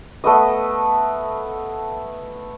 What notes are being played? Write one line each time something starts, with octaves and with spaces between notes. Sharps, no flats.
A3 B3 D#5